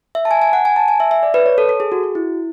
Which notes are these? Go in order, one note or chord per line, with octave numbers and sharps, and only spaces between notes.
E5
A5
G#5
G#5
F#5
G#5
A5
G#5
E5
E5
D5
B4
C#5
A4
A4
G#4
F#4
F#4
E4